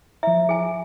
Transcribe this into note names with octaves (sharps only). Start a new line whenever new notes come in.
F3 E5 A#5
G#4 G#5